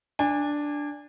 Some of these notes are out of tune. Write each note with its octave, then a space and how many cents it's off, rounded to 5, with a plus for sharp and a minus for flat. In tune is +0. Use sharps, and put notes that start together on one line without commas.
D4 +0 G#5 -30